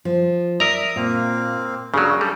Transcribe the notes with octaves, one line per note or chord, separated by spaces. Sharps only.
F3
A#4 D5 E5 A#5 D#6
A#2 A#3 C4
C#3 F#3 D4 G#4 A#4
G3 A4